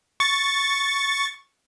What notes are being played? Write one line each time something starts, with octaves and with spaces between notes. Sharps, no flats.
C#6 A6